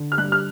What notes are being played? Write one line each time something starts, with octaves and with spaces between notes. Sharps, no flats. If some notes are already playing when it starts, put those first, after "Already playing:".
Already playing: D3
F6
G2 F#6
F6